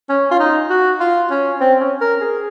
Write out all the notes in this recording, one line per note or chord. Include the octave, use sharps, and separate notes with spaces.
C#4
F4
D#4
F#4
F4
C#4
C4
C#4
A#4
G#4